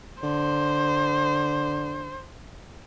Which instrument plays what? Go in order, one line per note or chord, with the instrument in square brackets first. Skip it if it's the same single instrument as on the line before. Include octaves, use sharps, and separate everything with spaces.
[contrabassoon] D3 [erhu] C5